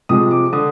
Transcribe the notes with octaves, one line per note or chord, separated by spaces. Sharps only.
C3 F3 G#3 D#6
D6
D3 D#6